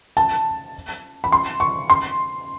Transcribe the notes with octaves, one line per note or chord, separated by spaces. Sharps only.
A5
B5
C6
C#6
C6